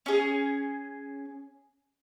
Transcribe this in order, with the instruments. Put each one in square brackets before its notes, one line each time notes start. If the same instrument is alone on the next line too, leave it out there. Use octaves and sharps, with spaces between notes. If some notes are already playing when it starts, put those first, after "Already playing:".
[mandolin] C#4 G#4